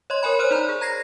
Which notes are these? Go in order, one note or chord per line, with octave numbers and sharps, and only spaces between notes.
C#5 D#5 C6
A#4 C#5 G#5 B5
C5 C#5 C6 F6 F#6
D#4 D5 A#5
G#4
A#5 G#6 A#6 C7